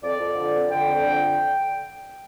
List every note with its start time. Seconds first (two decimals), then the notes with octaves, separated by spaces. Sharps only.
0.03 F2 D5
0.19 F2
0.36 D3
0.53 F2
0.70 D3 G5
0.86 F2
1.04 D3